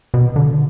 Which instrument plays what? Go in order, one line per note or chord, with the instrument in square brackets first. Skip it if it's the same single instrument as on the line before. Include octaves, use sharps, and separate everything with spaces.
[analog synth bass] B2
D3